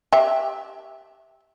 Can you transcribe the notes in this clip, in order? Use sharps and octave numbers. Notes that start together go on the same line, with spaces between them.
G4 E5